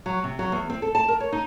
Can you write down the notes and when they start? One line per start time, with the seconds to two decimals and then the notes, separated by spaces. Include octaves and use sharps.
0.06 F#3
0.24 C3
0.39 F#3
0.52 E2
0.70 C4
0.82 A4
0.95 A5
1.08 A#4
1.20 C#5
1.32 D#4